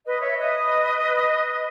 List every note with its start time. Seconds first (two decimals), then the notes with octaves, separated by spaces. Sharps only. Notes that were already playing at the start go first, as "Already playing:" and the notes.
0.05 B4 D#5
0.21 C#5 E5
0.36 B4 D#5